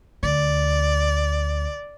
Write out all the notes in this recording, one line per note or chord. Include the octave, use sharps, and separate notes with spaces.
D2 D5